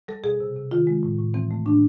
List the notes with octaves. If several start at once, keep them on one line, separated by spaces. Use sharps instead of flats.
G3 A4
B2 G#4
C3
C3
D#3 F4
G#3
A2
A2
E3 C4
A3
A2 D4